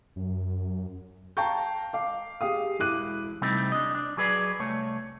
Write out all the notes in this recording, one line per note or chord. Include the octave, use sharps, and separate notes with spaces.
F#2
F5 G5 A5 A#5 C#6 G6
F5 D6
G4 G#4 F5 D#6
E1 E4 D6 F#6 D#7
C3 G3 A3 C4 D#4
D4 D#5
D4
F#3 G#4 B4 D5
C2 A3 C#5